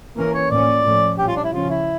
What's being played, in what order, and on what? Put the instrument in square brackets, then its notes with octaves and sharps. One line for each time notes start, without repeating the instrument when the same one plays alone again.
[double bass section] E3 A#3 C#4 [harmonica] A#4
[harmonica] C#5
[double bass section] A2 F3 A#3 C#4 [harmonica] D5
[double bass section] A2 F3 A3 C#4
[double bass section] A#2 G3 C#4 [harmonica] G4
[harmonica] F4
D4
E4
[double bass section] C#3 F3 C#4 [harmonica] F4
[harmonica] E4